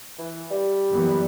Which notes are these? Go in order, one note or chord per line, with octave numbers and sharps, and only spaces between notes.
E3
G3
F#2 E3 B3